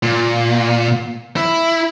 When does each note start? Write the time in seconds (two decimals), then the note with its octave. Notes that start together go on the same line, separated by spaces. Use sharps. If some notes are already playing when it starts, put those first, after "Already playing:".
0.03 A#2
1.36 E4